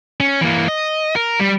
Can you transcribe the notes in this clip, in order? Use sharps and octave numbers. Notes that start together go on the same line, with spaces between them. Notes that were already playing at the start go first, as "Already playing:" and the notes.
C#4
E3 A#3
D#5
A#4
G3